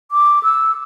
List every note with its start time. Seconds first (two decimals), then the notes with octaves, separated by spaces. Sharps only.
0.12 D6
0.43 E6